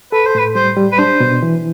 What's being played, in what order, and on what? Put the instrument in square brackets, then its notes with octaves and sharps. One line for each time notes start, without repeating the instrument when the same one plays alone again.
[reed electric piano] A4 [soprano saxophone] B4
[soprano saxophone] C5
[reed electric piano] A2 [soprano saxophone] B4
[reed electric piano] G3 [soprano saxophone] C5
[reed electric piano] G3
[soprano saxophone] B4
[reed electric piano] D4 [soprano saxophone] C5
[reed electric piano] B2
E3